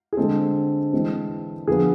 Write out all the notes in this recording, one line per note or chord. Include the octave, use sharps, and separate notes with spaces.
G#4
D3 G#3 C4 A4
E3 G#3 C4
D3 F3 B3 G#4